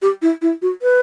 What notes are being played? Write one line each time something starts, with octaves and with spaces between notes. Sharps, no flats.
G4
E4
E4
F#4
B4